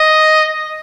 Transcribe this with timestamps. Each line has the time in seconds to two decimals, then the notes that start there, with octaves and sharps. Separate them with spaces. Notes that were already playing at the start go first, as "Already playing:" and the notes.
Already playing: D#5